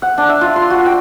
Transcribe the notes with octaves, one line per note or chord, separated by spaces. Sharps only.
F#5
D4
E5
F4
C6
F#4
G5